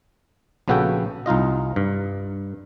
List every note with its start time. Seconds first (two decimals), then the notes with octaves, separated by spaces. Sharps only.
0.68 A#1 C#3 B3 F#4 A4 G5
1.26 C2 D#4 F4 D#5
1.76 G2